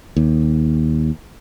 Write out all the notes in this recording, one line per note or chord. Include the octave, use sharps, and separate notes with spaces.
D#2